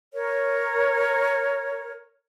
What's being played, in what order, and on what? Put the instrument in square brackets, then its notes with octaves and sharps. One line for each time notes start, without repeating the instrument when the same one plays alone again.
[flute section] A#4 C#5